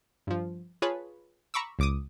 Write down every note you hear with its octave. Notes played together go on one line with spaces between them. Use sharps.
G2 F3
F4 G#4 B4 C#5 A5 B5
A#5 B5 C#6 D6 E6
C#2 D6 D#6